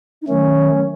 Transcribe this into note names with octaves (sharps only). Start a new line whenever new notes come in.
D#4
D#3 F#3 A3 C#4